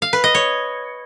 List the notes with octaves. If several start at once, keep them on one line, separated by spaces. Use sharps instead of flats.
F5
B4
D#5
C#5